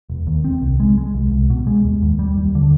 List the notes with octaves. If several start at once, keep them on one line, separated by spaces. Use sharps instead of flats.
E1
D#2
C4
C2
G#3
G#3
C2
C2
B2
G#3
D#2
D#2
G3
D#2
D3